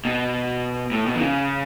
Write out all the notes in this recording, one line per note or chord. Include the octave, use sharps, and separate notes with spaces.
B2
A2
B2
E3
C#3